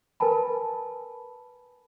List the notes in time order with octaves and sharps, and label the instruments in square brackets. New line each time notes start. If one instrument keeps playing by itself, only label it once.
[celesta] A#4 B4 G#5 A5 B5